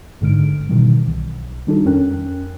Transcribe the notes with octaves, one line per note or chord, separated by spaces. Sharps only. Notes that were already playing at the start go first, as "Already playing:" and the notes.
G#1 G#2 D3 G#3 F6 D7
B2 D#3 E3 G3
B1
D#3 G3 D4 D#4 F#4 A4
F2 C#4 A#4 G5 F#6